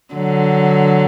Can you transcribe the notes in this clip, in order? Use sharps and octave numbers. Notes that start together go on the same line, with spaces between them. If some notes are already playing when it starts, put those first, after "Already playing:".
D3 F#3